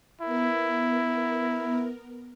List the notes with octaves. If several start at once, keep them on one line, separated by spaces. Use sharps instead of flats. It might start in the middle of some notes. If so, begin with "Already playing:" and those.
B3 E4 A#4